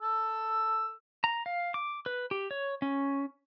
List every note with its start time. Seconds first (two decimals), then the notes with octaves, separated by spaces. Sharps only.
0.02 A4 E6
1.24 A#5
1.46 F5
1.74 D6
2.06 B4
2.31 G4
2.51 C#5
2.82 C#4